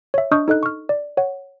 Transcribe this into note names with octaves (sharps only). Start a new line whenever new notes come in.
C#5 E5
D4 D#5 C#6 D#6 F6 G6
D#4 A4 D#5 F#6
C#6 F6
D5
C#5 F#5